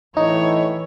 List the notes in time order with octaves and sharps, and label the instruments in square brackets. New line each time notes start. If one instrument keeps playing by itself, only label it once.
[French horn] A2 [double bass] E3 [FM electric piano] D#4 [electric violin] C#5